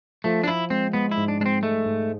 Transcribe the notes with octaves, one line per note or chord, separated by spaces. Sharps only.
F3 A3
D4
F3 E4
G#3 C4
G#3 B3
E4
G#2
D4
G#3 C4 D4
G#3 A3
G#2